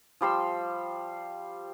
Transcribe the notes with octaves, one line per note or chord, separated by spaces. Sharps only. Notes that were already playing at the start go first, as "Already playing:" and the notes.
F3 G3 C6 E6